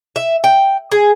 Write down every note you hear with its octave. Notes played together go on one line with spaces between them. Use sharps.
E5
G5
G#4